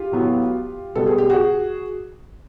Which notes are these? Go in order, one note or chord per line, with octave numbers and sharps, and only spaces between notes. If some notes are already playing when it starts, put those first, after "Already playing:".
Already playing: F4 G4
A2 F#3 B3
B2 G3 B3 A4
G#4
G4
F#4 G#4